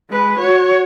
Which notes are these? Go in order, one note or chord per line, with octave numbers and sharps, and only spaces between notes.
G#3 B4
F#4 C#5